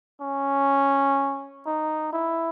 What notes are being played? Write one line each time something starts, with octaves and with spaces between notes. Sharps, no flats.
C#4
D#4
E4